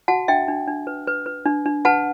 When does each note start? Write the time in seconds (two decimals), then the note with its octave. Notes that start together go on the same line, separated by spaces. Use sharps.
0.08 F#4 F#5 A5
0.28 D4 E5 G5
0.48 D4
0.67 D4
0.87 B4
1.07 B4
1.26 B4
1.46 D4
1.66 D4
1.85 B4 F#5 A5